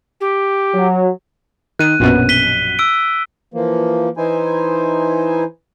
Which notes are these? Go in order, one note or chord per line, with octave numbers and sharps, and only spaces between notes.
G4
F#3
D#3 F#6 D#7
A#1 F#2 B2
B6 D#7 G7
E6 D7
E3 F3 A#3
E3 D#4 E4 C5 G#5